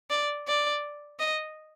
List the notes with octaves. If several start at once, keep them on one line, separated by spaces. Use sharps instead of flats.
D5
D5
D#5